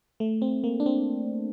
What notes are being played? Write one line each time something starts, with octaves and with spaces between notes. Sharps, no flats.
A3
C4
A#3
D4
C4